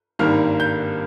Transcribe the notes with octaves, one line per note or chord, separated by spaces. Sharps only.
G#1 G2 D#3 G3 A#3 F6
G6